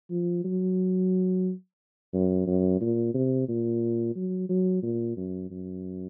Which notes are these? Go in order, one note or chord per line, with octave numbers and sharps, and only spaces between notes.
F3
F#3
F#2
F#2
A#2
C3
A#2
F#3
F#3
A#2
F#2
F#2